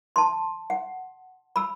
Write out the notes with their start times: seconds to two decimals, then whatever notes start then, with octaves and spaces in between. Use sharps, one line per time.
0.16 A5 C6
0.70 F#5
1.56 B5 E6